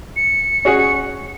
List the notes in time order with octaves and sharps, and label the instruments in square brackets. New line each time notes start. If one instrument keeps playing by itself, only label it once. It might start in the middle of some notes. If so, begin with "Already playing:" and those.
[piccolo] C#7
[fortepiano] C#4 F#4 G#4